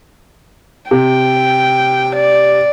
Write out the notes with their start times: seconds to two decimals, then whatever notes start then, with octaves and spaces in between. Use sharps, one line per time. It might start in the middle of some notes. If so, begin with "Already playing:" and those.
0.91 C3 G5
2.16 D5